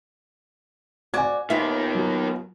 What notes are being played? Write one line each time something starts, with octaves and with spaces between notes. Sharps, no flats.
F#4 D5 G#5 G#6
D#3 A#3 B3 F4 E5
F#3